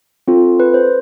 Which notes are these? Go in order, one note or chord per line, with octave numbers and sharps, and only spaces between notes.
C4 F4 A4
B4
C5